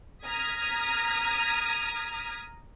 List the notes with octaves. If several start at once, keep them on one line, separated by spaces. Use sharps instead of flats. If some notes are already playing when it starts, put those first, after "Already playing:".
A#5 D#6 F6 G#6 B6